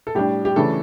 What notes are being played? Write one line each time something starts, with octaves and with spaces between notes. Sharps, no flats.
A4
A2 G3 D4 G4
G4
C#3 E3 A3 D4 A4